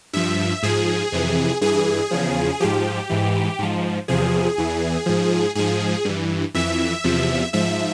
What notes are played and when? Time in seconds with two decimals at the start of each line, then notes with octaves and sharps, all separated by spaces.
0.13 G2 F3 E5
0.63 G#2 F3 G#4
1.12 F2 C3 E3
1.61 G2 E3 G#4
2.11 E2 C#3 F3
2.60 G#2 F3 G4
3.10 G#2 E3
3.59 G#2 F3
4.08 E2 C3 F3 G#4
4.58 E2 E3
5.06 G#2 F3
5.55 G#2 F3 G#4
6.05 G2 E3
6.54 F2 E3 E5
7.04 E2 C3 F3
7.53 G#2 F3 E5